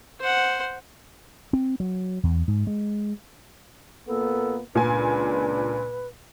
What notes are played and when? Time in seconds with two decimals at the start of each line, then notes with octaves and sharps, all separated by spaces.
0.20 C5 F#5
1.53 C4
1.80 F#3
2.23 E2
2.48 G#2
2.67 G#3
4.08 A#2 A#3 B3 A4
4.75 C#2 A#2 D4 B4 G#5